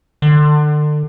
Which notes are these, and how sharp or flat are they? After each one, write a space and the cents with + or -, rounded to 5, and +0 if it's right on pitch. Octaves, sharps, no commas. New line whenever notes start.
D3 +35